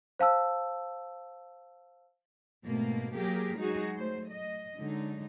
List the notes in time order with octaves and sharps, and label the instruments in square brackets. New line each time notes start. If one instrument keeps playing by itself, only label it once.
[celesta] C5 F5 A5 E6
[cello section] G#2 B2 A3 A#3 C4
F#3 A#3 G4 G#4 A#4
F#3 G#3 D#4 F#4 G#4
F#3 A3 C5
D#5
D3 F#3 G#3 D#4